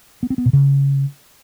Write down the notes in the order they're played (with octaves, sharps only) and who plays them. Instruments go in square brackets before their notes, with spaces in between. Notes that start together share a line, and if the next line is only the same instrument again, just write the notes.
[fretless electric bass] B3
C4
B3
B2
C#3